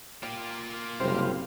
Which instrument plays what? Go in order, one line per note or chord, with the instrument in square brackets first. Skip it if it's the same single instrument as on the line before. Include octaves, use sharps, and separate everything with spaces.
[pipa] G3 [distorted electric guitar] A#3 F4
[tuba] F#1 [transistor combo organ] C3 G3 F5 [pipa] C5